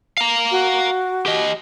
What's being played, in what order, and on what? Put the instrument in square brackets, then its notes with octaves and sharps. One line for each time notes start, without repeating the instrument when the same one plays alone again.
[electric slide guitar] F5 A#5
[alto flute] F#4
[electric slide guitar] G4 D#5